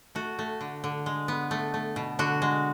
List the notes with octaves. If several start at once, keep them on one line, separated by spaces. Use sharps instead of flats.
A3 F#4
A3
D3
D3
G#3
B3
A3
A3
B2
D3 F#4
G#3